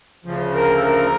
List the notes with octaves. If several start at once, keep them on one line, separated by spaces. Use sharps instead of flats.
D2 C#3 F3
A#4
A4
A#4